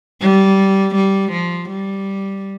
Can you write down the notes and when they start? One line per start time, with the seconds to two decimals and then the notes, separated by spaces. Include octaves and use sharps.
0.21 G3
0.95 G3
1.31 F3
1.69 G3